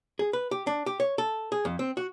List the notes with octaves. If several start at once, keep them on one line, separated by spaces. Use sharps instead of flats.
G#4
B4
G4
D4
G4
C#5
A4
G#4
F2
C4
F#4